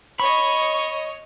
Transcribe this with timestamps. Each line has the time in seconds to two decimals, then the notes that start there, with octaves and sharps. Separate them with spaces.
0.20 C#5 D#5 B5 C#6